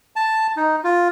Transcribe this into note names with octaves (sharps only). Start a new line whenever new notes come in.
A5
D#4
F4